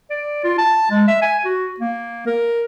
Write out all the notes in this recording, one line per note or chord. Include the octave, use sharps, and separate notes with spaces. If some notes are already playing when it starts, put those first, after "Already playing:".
D5
F4
A5
G#3
E5
G#5
F#4
A#3
A#4